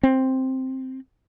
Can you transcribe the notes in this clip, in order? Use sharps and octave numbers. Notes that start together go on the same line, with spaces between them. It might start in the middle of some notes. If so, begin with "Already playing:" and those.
C4